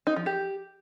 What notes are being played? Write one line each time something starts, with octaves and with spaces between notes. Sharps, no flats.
D#4
F3
G4